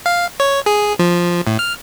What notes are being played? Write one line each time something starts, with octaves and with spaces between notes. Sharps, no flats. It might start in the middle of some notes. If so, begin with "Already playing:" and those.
F5
C#5
G#4
F3
A2
F6